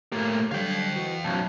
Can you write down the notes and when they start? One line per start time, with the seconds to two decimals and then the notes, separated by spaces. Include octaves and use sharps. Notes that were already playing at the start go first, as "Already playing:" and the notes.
0.12 A2 A#3 G4
0.52 D3 F#3 G3 F5 G5
0.96 E3 F#4
1.25 B1 F#2 A5